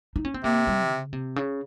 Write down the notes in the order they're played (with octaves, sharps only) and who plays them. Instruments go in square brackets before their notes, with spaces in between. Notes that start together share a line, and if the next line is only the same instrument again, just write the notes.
[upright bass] D#4
C#4
C4
[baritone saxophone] C3 [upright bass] A#3
[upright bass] G3
C#3
C3
C#3